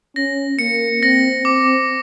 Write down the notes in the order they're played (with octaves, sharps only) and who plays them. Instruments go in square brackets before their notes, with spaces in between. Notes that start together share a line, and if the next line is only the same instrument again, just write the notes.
[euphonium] C#4 [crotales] A#6
[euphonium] A#3 [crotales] C#7
[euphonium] C4 [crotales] A#6
[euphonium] C4 [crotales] D6